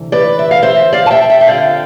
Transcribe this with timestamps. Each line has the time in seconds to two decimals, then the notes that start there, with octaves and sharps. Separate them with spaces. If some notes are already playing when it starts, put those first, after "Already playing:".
Already playing: D2 C3 E3
0.12 B4 D5
0.39 E5
0.51 F5
0.62 C5 E5
0.93 D5 F5
1.06 A5
1.11 E5 G5
1.30 E5 G5
1.41 G5
1.47 D2 D3 F3 C4 D5 F5